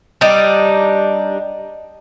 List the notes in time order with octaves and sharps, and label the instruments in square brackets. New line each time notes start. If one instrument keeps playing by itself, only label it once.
[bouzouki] G3 D4 D#4